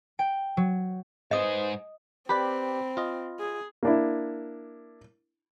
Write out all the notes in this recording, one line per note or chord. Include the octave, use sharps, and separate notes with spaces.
G5
F#3
G#2 D#4 G#4 B4 C5 D#5 D#6
C4 G4 B4 D5 B5
F4 D#5
G#4
A#3 D4 E4